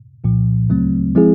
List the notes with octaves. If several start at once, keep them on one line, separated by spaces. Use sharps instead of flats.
C2 A#2 F3
D2 C#3 F#3 A3 C4
F3 G#3 C4 E4 G#4